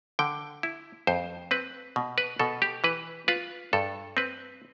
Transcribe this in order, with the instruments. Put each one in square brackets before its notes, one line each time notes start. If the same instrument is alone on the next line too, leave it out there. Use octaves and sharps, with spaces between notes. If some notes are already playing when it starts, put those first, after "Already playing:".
[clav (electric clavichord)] D3 G5
E4
F2 C5
C4 B4
B2
B4
B2 A4
G4
E3 B4
F4 B4
G2 A4
C4 B4